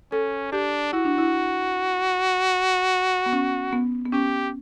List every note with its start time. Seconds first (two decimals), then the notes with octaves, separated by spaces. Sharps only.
0.12 C#4 A4
0.52 D4 G4
0.93 E4 F#4
1.05 D4
1.18 E4
3.26 B3
3.33 C#4
3.73 B3
4.06 B3
4.13 C#4 G4